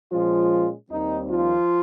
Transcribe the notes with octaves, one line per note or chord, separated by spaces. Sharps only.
A#2 F3 G#3 C#4 F4
D#2 D#3 G3 C4 D#4
F3 F4